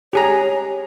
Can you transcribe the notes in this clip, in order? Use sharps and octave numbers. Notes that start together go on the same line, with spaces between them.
G4 G#4 C#5 A#5